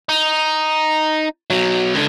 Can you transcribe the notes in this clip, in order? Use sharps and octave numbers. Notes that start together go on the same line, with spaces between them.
D#4
B2 F#3
C#2 D3